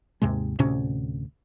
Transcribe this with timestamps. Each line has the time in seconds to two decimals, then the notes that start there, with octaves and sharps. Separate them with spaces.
0.22 D#2 G#2 C3 G#3
0.59 D2 A2 C3 C#4